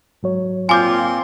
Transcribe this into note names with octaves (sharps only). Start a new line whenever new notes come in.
G#2 F#3 C#5
A#2 C4 F4 G#5 C6 D6 G6